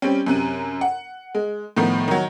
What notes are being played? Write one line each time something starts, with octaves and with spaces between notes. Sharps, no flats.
G3 C4 C#4
F#2 C3 F#6 D#7
F#5
G#3
A2 D#3 F3 B3
D#3 F#3